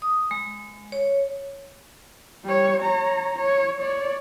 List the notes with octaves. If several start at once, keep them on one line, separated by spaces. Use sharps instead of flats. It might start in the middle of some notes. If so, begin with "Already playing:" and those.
D#6
G#3
C#5
G3 C#5
C#5 A#5
C#5
C#5 D5